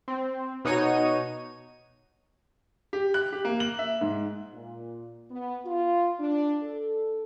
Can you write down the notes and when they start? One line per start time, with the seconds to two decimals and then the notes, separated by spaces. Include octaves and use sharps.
0.08 C4
0.65 B2 D#4 F#4 C#5 D#7
2.93 G4
3.14 F#6
3.32 G4
3.45 A#3
3.60 F#7
3.79 E5
4.01 G#2
4.53 A#2
5.31 B3
5.65 F4
6.19 D4
6.63 A4